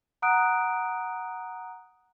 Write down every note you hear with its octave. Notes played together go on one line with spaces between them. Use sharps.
F#5 A#5 D#6 F#6 D7